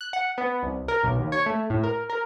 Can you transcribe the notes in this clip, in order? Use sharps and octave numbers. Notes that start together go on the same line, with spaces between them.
F#6
F#5
B3
C2
A#4
B1
D#2
C#5
A3
A2
A#4
A#4